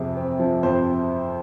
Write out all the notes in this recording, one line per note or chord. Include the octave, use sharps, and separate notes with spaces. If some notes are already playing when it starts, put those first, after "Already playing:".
Already playing: F2 C3 G#4
C4
F3
F2 C5